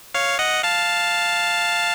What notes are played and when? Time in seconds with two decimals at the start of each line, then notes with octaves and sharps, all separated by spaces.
0.14 C#5 F5
0.39 D#5 F#5
0.63 F5 A5